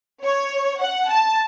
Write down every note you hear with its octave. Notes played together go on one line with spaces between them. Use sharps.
C#5
F#5
A5